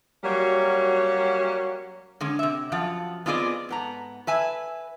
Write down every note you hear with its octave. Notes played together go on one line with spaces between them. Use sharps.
F#3 G3 A#3 C#4 F#4 C#5
D3 G#3 C#4
C3 E5
F#2 F3 F4 F#5
B3 C4 F4 G#4 D5 D#5
G#2 B3 A#5
B4 E5 G#5